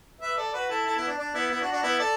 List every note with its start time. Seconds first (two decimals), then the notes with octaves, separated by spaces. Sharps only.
0.21 B4 E5
0.37 A4 D5
0.54 F#4 B4
0.70 E4 A4
0.86 E4 A4
0.97 B3 E4
1.07 D4
1.19 D4
1.34 B3 E4
1.51 B3 E4
1.61 D4 F#4
1.72 D4 F#4
1.83 B3 E4
1.99 A4 D5